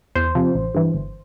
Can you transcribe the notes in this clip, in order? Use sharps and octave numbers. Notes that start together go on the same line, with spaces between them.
E2 C5
C3 F3
A1
G2 E3
G1